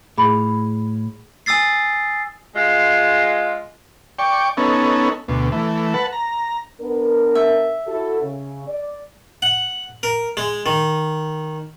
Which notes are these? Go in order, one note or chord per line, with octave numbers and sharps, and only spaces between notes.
A2 G#4 B5
G#5 D#6 E6 A6 C7
G#3 F4
D5 G5 C#6
B3 C#4 D#4 A4
D2 B2
E3 A3
B4 F#5 A5
A#5
B3 D4 A#4
E5
E4 F#4 A4
C#3
D5
F#5
A#4
G#3
D#3